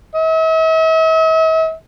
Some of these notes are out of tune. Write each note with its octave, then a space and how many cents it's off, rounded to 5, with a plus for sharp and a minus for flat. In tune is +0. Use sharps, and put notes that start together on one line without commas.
E5 -45